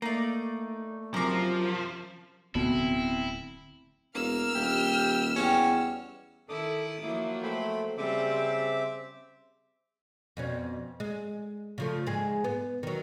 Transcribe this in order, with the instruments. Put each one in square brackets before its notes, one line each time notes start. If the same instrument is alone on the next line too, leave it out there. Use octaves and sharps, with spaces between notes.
[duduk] A3 [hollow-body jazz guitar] A#3 [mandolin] D#4 D5
[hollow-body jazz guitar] F#2 A2 C3 [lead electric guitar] F3 [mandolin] A#4 D6
[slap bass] D1 D2 D3 [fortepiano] B2 [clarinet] C4 [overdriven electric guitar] E4
[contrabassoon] E1 [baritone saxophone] A#3 [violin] E6 F6
[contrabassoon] D#1 [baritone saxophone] G4
[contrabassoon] E2 [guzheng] G3 F#4 D#5 [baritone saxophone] C#4
[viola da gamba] D#3 E4 [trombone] A4 [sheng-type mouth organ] D6 D#6
[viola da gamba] F3 F#3 A#3 [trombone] E4
[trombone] A3 [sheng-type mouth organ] C5 G5 B5
[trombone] C#3 [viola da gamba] G3 C5 [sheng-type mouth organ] C4 E5 D6
[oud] F2 B2 C#4
G#3
C#3 F3 A3
G#2 G#3 G#4
B3
D#3 F#3